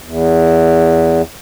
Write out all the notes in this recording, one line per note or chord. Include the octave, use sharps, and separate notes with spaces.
E2